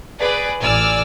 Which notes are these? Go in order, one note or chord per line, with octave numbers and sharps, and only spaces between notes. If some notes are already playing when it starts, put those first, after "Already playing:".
G#4 B4 D5
A1 D5 G#5 E6 F6